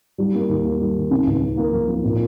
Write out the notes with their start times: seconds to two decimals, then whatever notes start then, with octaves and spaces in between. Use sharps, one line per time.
0.18 G3
0.34 A#3
0.49 D#2
0.64 A#3
0.80 G3
0.96 D#3
1.11 C#3
1.27 C#2
1.42 C#3
1.57 A#3
1.73 F3
1.88 A#3
2.04 A#2